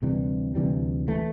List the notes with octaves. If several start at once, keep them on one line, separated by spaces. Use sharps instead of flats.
D2 C3 E3 G3
D2 C3 E3 G3
E3 A3